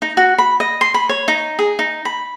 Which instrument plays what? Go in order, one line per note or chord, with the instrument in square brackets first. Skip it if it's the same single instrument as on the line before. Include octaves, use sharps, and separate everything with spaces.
[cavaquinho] D#4
F#4
B5
D#5
C6
B5
C#5
D#4
G#4
D#4
B5